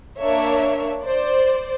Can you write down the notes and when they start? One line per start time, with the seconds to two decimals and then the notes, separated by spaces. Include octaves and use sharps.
0.18 A#3 D4 C#5 E5
1.02 C5 D5